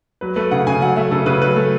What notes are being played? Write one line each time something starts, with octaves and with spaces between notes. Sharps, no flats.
F#3 B4
A3 B4
C#3 F#5
C#3 G#5
F#3 F#5
A3 E5
C#3 A4
C#3 B4
F#3 B4
A3